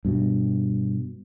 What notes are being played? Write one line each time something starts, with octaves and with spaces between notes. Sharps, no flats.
G2 B2